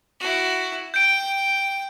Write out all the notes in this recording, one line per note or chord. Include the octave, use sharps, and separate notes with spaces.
E4 F#4
G5 G6 D7